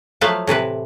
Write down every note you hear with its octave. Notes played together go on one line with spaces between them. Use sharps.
F3 F#3 A3 B4 F5 A5
A2 C3 E3 B4